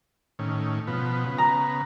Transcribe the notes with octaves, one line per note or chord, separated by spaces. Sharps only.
A2 D#3 C#4
B2 F3 B3
C#3 B3
A#5